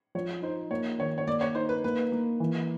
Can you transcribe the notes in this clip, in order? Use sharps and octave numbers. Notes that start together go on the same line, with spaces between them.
F3 C#5
D#4 C5
A#3 C#5
D#3 C#5
C#5
A#3 D5
C#5
D#4 C5
B4
A#3 B4
A#3
E3